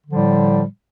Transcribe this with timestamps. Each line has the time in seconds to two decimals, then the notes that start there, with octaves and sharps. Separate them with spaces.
0.07 D3
0.10 F3
0.13 G3
0.15 A2